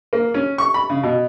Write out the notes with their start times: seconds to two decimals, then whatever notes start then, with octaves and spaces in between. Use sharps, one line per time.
0.13 A#3
0.34 C#4
0.58 C#6
0.74 B5
0.89 C#3
1.03 B2